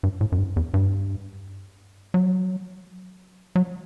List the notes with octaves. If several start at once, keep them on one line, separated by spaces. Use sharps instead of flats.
G2
A2
F#2
G2
E2
G2
F#3
F#3